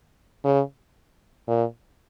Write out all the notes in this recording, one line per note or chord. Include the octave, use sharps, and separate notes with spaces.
C#3
A#2